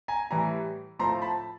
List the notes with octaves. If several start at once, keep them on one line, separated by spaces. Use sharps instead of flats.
G#5 A#5
A2 E3 G3 G#5 A#5
A2 F3 A3 A#5 C6
A5 B5